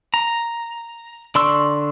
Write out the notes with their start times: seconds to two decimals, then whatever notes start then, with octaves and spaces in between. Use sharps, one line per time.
0.14 A#5
1.35 D3 D5 C6 C#6 E6